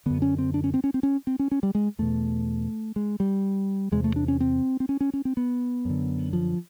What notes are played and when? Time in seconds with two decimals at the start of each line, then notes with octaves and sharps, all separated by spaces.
0.06 F#2 D3 B3
0.22 C#4
0.38 C4
0.54 D4
0.64 C#4
0.74 C4
0.84 C#4
0.94 C4
1.03 C#4
1.27 C4
1.39 C#4
1.51 C#4
1.63 G3
1.75 G#3
1.99 E2 B2 A3
2.96 G#3
3.20 G3
3.92 E2 C3 G#3
4.04 A3
4.16 D4
4.28 C#4
4.40 C4
4.80 C4
4.89 C#4
5.01 C#4
5.14 C#4
5.25 C4
5.37 B3
5.85 F#2 D3
6.33 F3